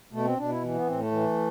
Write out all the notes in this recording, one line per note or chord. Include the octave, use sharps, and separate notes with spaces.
B2 A3
C4
B2 D4
E4
E3
B3
A2 C4
A3
E3